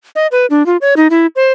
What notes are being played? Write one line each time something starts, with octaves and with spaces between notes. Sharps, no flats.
D#5
B4
D4
F4
C#5
D#4
E4
C5